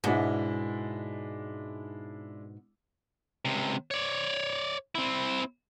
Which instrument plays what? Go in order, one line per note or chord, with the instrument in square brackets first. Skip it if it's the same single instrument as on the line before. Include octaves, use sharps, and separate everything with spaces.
[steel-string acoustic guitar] G#2 B2 [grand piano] G#3 D4 E4
[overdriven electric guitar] C#2 C3
C#5 D5
C4 E4